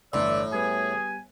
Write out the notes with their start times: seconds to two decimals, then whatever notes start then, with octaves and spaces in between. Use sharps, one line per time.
0.14 G1 A2 E3 D5 E5 C6
0.53 G3 B3 G#4 B4 G#5